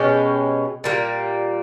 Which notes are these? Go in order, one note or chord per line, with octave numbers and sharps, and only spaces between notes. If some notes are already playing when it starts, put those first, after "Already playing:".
Already playing: B2 G#3 C#4 G4
A#2 G3 A#3